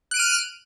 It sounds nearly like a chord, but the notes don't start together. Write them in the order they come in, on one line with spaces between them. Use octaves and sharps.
F#6 D7 D#7 F6